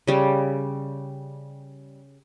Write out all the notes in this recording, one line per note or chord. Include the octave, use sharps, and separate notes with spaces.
C#3 G3